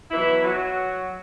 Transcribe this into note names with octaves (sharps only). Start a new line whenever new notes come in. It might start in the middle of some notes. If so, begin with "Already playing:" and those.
B2 E3 F#3 E4
F#3 F#4